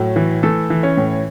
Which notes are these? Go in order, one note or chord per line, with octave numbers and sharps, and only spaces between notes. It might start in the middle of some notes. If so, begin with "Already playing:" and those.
Already playing: A2 F#3
E3
E3 A3 A4
E3
C#4 C#5
A2